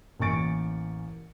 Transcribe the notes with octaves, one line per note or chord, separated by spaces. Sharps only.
A1 A#3 G#5 C#6 A6 D7